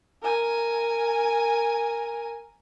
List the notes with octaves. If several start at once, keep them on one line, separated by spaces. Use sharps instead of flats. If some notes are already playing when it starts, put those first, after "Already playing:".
A#4 G#5